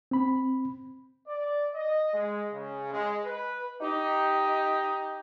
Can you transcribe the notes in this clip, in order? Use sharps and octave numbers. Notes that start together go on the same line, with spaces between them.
C4 B5
D5
D#5
G#3
C#3
G#3
B4
D#4 G4